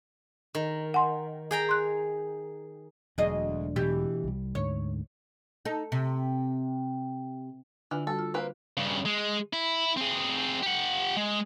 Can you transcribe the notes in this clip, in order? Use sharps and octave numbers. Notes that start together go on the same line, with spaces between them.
D#3
F#5 G#5 C6
G#4 G5 A#5
C6 F#6
E1 D2 F#3 G#4 D#5
B2 E3 G4
C2 G3
D2 G#2 D3 C#5
D#4 A4
C3
D3 E3 D4 F4
G3 F#4 A4
F4
A#3 C4 B4
G2 C#3
G#3
E4
C4 G#4
G4 F#5
G#3